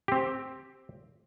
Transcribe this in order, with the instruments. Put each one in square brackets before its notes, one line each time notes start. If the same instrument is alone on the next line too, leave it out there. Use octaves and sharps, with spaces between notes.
[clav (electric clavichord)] C4 G4